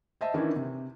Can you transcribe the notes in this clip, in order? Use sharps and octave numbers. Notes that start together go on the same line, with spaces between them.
C5 D#5 E5 A5
D#3 E3 C#4 D4 E4
C3